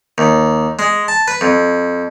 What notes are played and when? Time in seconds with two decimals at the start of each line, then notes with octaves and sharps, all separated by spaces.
0.18 D#2
0.79 G#3
1.08 A5
1.28 B4
1.41 F2